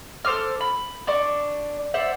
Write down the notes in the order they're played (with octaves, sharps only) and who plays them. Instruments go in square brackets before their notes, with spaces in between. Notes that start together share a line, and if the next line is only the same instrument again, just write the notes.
[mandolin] A4 C5 D6 F6
B5
D4 D5 C#6
C5 D5 E5 F#5